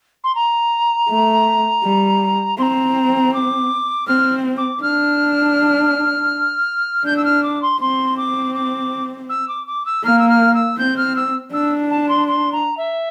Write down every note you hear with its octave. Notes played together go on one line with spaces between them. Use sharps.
C6
A#5
A3
G3
C4 A#5 C6
D6
C4 F6
D6
D4 F6
D4 G6
E6
F6
D6
C6
C4 C6
D6
D6
E6
D6
D6
E6
A#3 F6
E6
F6
E6
C4 G6
F6
E6
D4 E6
A5
C6
C6
A#5
E5